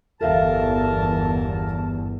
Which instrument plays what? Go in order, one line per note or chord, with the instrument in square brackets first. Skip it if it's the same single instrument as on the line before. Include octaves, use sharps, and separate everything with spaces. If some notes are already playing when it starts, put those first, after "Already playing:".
[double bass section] G1 E2 [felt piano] A4 E5 F5 [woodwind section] A#4 A5